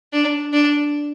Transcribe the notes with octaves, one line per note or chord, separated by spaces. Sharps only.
D4
D4